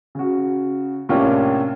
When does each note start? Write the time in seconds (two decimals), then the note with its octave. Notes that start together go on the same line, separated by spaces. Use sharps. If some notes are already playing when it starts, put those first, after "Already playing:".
0.15 C#3 F#4
1.09 A2 C3 A#3 C#4 D4 F4